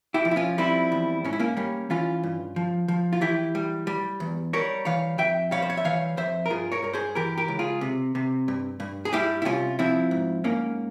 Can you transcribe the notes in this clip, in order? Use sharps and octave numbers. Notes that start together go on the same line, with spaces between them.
E4 G4
F3
E4
C#4 F4
G3 C4 E4
E2
G#2 C#4
E4
A#3 C#4
G3 A#3 C#4
E3 C#4 F4
G2
F3
F3
F4
E3 E4 G4
G3
G3
E2
G3 A#4 C#5
E3 C#5 F5
F2 E5 G5
G3 C#5 F5
C5
C#5
E5
E3 C#5 F5
F2 C5 E5
A#4
G2 F4 G#4
A#4 C#5
G2 A#4
G#4 C5
E3 G4 A#4
G4 A#4
C#2
F4 G#4
C3
C3
G2
G2
G#4
G3 E4 G4
E4
C2 C#4 F4
F3 C4 E4
G#2
G#2 A#3 C#4